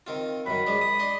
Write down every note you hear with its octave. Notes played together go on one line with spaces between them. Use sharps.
D#3 C4 F4
F#2 D#3 B5
F3 G#3 D4
D#6
D4 D#5 C6